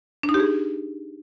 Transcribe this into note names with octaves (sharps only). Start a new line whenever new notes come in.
D4
D#4
G4
G#4